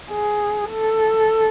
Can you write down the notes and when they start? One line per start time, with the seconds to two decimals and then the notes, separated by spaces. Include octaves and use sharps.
0.10 G#4
0.70 A4